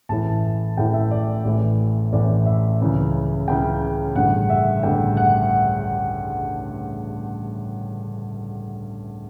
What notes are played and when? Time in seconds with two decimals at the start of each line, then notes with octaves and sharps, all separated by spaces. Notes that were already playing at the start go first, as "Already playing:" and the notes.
0.09 A1 A2 E3 A5
0.77 A1 A2 E3 G5
0.94 E5
1.11 D5
1.45 A1 A2 E3
2.12 A1 A2 E3 D5
2.46 E5
2.81 C#2 C#3 E3
3.48 C#2 C#3 E3 G5
4.16 A1 G2 D3 F#5
4.50 E5
4.83 A1 G2 D3 G5
5.17 F#5